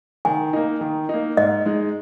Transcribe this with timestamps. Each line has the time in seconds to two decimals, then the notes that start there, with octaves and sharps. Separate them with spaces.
0.25 D#3 G#5
0.53 A#3 D#4
0.81 D#3
1.09 A#3 D#4
1.37 G#2 D#5
1.66 G#3 D#4